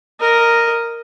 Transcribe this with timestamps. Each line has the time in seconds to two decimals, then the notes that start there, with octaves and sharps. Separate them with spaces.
0.20 A#4 D#5